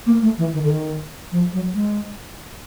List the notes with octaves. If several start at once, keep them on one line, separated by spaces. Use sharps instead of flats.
A#3
A3
E3
D#3
D3
D#3
F3
F#3
G#3